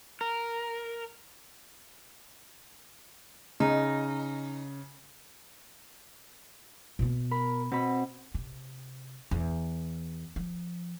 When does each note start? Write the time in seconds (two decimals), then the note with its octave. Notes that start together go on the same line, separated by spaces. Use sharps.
0.21 A#4
3.60 C#3 D#4
6.99 B2 B3
7.31 A#4 B5
7.72 B2 C4 B5
8.34 C3
9.31 E2
10.36 F3